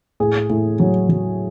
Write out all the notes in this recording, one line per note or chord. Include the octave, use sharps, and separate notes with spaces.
A2 G#4
A2
F#3
F#3